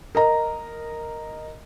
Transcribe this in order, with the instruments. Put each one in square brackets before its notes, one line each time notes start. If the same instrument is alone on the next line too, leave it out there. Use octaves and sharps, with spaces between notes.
[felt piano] A#4 D#5 A#5